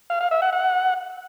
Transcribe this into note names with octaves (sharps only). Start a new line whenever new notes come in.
F5
F5
E5
F#5
F#5